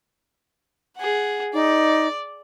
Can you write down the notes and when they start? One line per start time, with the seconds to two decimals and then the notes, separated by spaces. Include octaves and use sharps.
0.97 G#4 F#5
1.53 D#4 D5